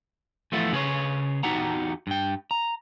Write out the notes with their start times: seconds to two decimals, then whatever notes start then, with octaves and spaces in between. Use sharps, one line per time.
0.52 E3 F3 A3 B3 E4 F4
0.73 C#3 G#4 B4 C#5
1.43 E2 D#4 F#4 G4 F#5 A#5
2.07 G2 G5
2.51 A#5